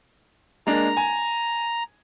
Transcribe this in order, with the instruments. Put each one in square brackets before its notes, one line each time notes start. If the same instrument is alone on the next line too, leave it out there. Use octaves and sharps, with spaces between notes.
[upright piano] G#3 A#3 D4 [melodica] A#5
[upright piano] G#5